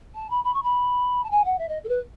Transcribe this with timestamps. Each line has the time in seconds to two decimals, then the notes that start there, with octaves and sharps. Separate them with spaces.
0.15 A5
0.30 B5
0.44 B5
0.54 C#6
0.63 B5
1.24 A5
1.31 G#5
1.45 F#5
1.59 E5
1.69 D#5
1.84 A4
1.89 B4